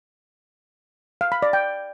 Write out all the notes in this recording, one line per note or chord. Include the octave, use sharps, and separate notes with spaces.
F5
B5
D5
G5